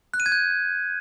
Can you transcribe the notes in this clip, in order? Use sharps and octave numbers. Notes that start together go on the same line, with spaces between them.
F#6
D#7
G#6
G6